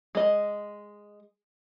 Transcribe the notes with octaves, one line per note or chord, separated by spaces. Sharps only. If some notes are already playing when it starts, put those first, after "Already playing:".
G#3 D#5